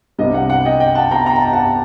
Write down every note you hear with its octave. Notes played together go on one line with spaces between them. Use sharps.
C2 C3 G3 D4 D#5
F#5
F#5
D#5 G5
D#5 G5
F#5 A5
G5 A#5
A#5
A5
G5
F#5 A5